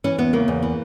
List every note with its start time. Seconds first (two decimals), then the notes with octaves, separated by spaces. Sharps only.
0.04 E3 C#4
0.18 E2 B3
0.33 C#3 A#3
0.48 E2
0.63 E3